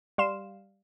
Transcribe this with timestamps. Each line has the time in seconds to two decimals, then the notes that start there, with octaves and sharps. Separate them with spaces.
0.18 G3 F5 C6 E7